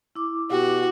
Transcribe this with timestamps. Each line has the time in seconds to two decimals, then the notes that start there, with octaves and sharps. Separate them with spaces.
0.15 E4 D6
0.51 B2 F#4 G4